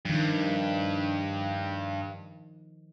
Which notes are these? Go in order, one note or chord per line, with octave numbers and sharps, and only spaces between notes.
G2 D#3 F3